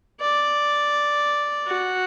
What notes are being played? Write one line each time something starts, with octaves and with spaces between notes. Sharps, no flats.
D5
F#4